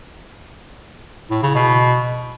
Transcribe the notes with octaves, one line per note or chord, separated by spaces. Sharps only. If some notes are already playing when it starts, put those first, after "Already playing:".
A2
C#3
B2